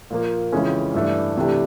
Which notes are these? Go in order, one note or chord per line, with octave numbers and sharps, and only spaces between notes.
A#2 F3 A#3
F2 C#3 E3 G#3 C#4
G2 E3 A3 D4
C3 E3 A3 D4 G4